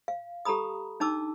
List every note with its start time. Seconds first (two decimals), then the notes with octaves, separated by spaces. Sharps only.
0.08 F5
0.45 G4 A4 A#5 B5 D#6
1.00 D4 D#4 A5 D6 E6